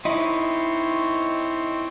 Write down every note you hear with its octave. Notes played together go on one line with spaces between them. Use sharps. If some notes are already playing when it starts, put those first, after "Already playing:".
C4 D#4 E4 C#5 C6